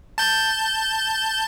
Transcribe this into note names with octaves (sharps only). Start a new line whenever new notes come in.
A5 G6